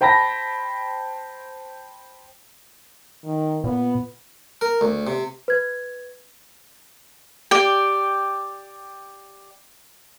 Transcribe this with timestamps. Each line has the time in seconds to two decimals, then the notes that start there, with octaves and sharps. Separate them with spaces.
0.01 C5 G5 A5 B5 A#6
3.24 D#3
3.64 A#2 B3
4.61 A#4
4.81 D2
5.07 C3
5.48 B4 G#6
7.51 G4 D5 G5